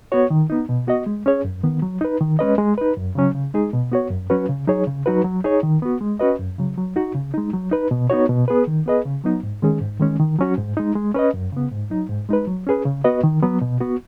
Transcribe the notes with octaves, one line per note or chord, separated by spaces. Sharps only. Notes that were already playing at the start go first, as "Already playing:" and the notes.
B3 F#4 C#5
D#3
B3 D#4
B2
B3 F#4 D#5
G#3
C#4 G#4 C#5
F#2
D#3 B3
F#3
D#4 B4
D#3
G#3 C#4 B4 D#5
G#3
D#4 B4
F#2
C#3 F#3 C#4
C#3
G#3 D#4 G#4
B2
B3 F#4 C#5
F#2
F#3 C#4 F#4 B4
C#3
F#3 D#4 G#4 C#5
C#3
F#3 D#4 F#4 B4
F#3
D#4 G#4 C#5
D#3
B3 F#4
G#3
C#4 F#4 B4 D#5
F#2
C#3 F#3
F#3
D#4 F#4
C#3
G#3 D#4
F#3
D#4 B4
B2
B3 D#4 F#4 C#5
B2
B3 G#4 B4
D#3
B3 G#4 B4 D#5
C#3
F#3 B3 D#4
G#2
D#3 G#3 C#4 G#4
G#2
D#3 G#3 C#4
D#3
F#3 C#4 F#4
G#2
G#3 D#4
G#3
C#4 B4 D#5
F#2
C#3 B3
G#2
F#3 D#4
G#2
G#3 D#4 B4
F#3
C#4 G#4 B4
C#3
B3 F#4 B4 D#5
D#3
F#3 B3
B2
B3 F#4